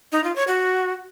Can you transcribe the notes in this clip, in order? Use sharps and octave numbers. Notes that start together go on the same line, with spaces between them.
D#4
F4
C#5
F#4